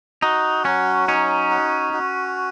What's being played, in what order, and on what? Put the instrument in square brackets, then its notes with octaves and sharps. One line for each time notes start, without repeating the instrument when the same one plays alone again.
[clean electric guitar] D#4 [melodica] F#4
[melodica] F#3 [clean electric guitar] C#4
[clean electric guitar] C#4 [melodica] D#4
[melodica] F#4
F#4